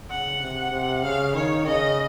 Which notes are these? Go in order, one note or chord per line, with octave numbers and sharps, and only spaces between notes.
C#3 F#5
C3
C3
C#3 F5
D#3 C#5
C#3 D#5